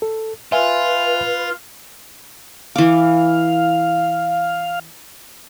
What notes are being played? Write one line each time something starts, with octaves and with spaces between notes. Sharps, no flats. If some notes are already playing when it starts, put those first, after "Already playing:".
A4
F4 B4 E5 F5 G#5
E3 F5 D6